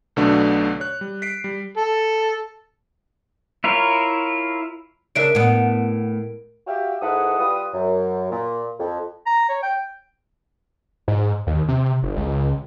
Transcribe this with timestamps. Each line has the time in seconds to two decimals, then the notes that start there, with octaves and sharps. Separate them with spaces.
0.16 B1 B2 D3 A3 B3 D4
0.80 C#5 F#6
1.01 G3
1.22 B6 C7 D7
1.44 G3
1.77 A4
3.64 E4 F4 A#4 C#5
5.15 C#3 D4 A#4 E5 D7
5.35 A2 B3
6.67 F#4 G4 E5 F5 G5
7.01 G#2 E4 A4 B4 F#5 D#6
7.39 G3 F4 B4 D#6
7.73 F#2
8.31 A#2
8.79 F2
9.26 A#5
9.49 C#5
9.63 G5
11.08 G#2
11.47 D#2
11.68 C3
12.03 G1
12.17 C#2